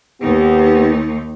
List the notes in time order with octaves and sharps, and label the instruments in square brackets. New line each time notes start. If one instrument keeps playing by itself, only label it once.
[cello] D#2 D#4 [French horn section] B3 G4